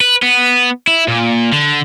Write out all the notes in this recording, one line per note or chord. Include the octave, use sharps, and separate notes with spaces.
B4
B3
E4
A#2
D3